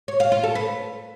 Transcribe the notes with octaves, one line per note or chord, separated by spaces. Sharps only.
C#5
F5
F4
A4
B4